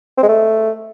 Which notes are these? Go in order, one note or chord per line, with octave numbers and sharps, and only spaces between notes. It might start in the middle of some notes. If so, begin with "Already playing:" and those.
C4
G#3
A3